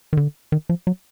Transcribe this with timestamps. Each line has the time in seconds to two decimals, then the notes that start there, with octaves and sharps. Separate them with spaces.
0.13 D#3
0.17 D3
0.52 D#3
0.69 F3
0.87 F#3